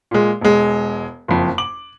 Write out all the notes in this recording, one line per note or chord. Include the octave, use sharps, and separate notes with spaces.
A#2 G#3
E1 G#3
F#1 F2
D6 F#7